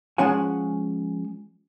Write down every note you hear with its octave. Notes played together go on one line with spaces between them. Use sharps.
F3 G#3 C#4 F#5 G#5